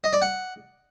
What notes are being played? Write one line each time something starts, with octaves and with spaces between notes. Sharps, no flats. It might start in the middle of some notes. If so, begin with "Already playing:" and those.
D#5
D5
F#5